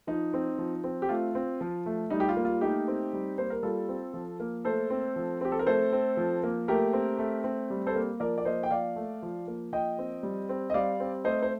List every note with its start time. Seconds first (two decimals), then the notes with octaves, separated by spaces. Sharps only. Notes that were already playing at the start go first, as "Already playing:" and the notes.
0.07 F3 D#4
0.34 C4
0.58 F3
0.84 C4
1.02 G4
1.09 A3 F4
1.35 C4
1.61 F3
1.86 A3
2.10 G3 D#4
2.20 G4
2.29 F4
2.37 A#3
2.45 F4
2.61 A3 D#4 G4
2.88 C4
3.13 G3
3.38 A#3 C5
3.50 A#4
3.63 G3 F4 A4
3.89 C4
4.14 F3
4.40 A#3
4.65 A3 A4 C5
4.90 C4
5.16 F3
5.41 C4 G4
5.52 A4
5.59 A#4
5.67 A3 A4 C5
5.92 C4
6.17 F3
6.43 A#3
6.68 A3 G4 A#4
6.93 C4
7.19 A3
7.44 C4
7.70 G3
7.87 A4 C5
7.96 A#3
8.20 F3 A#4 D5
8.38 D5
8.45 A#3 C5 D#5
8.63 G5
8.71 F3 D5 F5
8.96 A3
9.23 F3
9.48 A#3
9.73 F3 D#5 G5
9.98 C4
10.23 G3
10.49 C4
10.70 D#5
10.74 G3 D5 F5
11.00 C4
11.25 A3 C5 D#5
11.43 C5